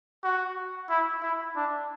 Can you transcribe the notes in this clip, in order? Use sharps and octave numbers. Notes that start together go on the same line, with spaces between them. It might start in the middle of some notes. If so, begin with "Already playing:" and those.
F#4
E4
E4
D4